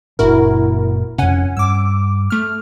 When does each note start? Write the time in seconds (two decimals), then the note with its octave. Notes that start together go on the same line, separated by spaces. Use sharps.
0.19 F#1 A#2 D4 E4 F#4 A#4
1.18 F2 C3 C#4 F#5 G#5
1.57 G2 D6 E6
2.30 A3 F6